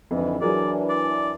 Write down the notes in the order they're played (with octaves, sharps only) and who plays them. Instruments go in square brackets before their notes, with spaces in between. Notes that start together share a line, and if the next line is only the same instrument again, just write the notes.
[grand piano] F2 [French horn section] G#2 D3 E3
[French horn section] E3 D4 [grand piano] F#3 G#4 A#4 [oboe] D5
[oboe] D5